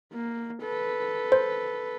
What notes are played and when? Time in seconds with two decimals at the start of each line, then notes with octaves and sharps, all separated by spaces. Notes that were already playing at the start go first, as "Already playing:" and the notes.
0.14 A#3
0.63 A4 B4
1.32 C5